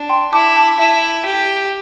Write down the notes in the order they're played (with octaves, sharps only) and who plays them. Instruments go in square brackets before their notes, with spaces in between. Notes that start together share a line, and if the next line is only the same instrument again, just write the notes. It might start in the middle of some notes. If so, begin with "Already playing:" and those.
Already playing: [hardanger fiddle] D4
[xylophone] G5 C6
[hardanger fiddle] E4 [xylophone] A5 D6
[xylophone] A5 D6
[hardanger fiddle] E4 [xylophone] E5 A5
[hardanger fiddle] G4